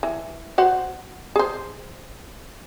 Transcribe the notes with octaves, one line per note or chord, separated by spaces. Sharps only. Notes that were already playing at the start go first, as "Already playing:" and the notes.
E3
F#4 C5 F#5
G#4 C5